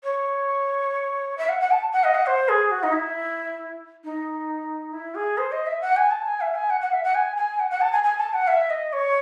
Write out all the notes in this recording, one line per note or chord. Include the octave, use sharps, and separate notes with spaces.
C#5
E5
F#5
F#5
A5
F#5
D#5
F#5
C5
G#4
F#4
D#4
E4
D#4
E4
G#4
C5
D#5
E5
F#5
G#5
A5
G#5
E5
G#5
F#5
F#5
E5
F#5
G#5
G#5
F#5
F#5
A5
G#5
G#5
A5
F#5
E5
D#5
C#5